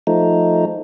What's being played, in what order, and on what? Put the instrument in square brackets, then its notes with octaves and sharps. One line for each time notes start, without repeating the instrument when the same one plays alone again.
[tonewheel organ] F3 A3 D#4